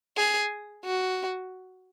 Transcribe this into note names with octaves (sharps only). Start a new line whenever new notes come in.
G#4
F#4